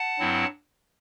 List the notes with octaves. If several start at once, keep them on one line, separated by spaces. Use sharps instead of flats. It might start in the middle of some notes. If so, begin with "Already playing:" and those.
Already playing: F#5 A5
G2 F#3 C4 E4